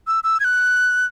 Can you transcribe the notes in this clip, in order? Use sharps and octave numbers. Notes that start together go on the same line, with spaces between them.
E6
E6
G#6
F#6